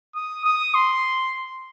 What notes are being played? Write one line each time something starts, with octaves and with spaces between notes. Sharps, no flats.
D#6
D#6
C6